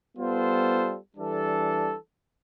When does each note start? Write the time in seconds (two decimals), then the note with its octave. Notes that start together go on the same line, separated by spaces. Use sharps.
0.17 G3 B3 F4 A4 C5
1.16 E3 G3 D4 A4